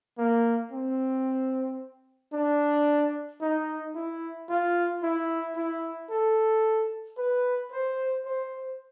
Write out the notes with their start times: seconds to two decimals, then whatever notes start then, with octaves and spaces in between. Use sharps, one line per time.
0.18 A#3
0.72 C4
2.33 D4
3.41 D#4
3.95 E4
4.49 F4
5.03 E4
5.56 E4
6.11 A4
7.18 B4
7.72 C5
8.26 C5